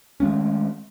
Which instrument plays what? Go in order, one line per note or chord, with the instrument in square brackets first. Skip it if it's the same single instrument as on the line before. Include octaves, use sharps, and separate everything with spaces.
[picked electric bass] D#3 G#3 A3 C#4